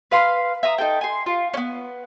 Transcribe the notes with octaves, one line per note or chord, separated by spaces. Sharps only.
B4 F5 C6
E5 A#5 D#6
D#4 A4 G5
G#5 C6
F4
B3 C#4